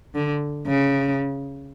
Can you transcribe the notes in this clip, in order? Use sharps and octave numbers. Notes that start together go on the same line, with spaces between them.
D3
C#3